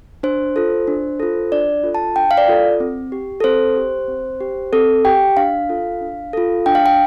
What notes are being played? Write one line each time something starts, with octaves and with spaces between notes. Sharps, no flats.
D4 C5
F4 A4
D4
F4 A4
D4 D5
F4 A4
A5
D4 G5
F5
D5
F4 A4
C4
G4
A4
C4 C5
G4
C4
G4
C4 A4
G4 G5
D4 F5
F4 A4
D4
F4 A4
D4 G5
F5
G5